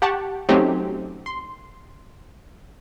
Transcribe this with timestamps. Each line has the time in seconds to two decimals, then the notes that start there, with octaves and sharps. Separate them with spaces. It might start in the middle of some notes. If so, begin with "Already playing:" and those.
0.02 G4 F#5 A5 C#6
0.49 F#3 A3 C4 C#4 D#4 G4
1.26 C6